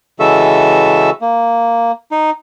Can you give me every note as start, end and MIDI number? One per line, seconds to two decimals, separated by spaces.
0.20 1.10 49
0.20 1.10 52
0.20 1.10 56
0.20 1.10 66
0.20 1.10 69
0.20 1.10 76
1.21 1.91 58
2.12 2.30 63